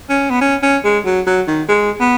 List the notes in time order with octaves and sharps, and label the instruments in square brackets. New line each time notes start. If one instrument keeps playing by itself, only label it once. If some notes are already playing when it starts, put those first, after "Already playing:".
[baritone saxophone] C#4
B3
C#4
C#4
G#3
F#3
F#3
D#3
G#3
B3